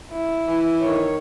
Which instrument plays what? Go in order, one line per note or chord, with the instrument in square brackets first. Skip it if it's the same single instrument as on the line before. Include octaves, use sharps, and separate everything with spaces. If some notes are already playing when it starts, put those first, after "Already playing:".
[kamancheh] E4
[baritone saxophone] E3
[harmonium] D#3 C#5